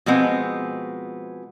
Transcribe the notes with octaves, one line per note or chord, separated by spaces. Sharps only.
B2 F3 G#3 B3 C4